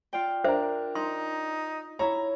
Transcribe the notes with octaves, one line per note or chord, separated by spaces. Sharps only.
F4 D5 G5
D4 A#4 C5 E5
D#4 C6
E4 C#5 A#5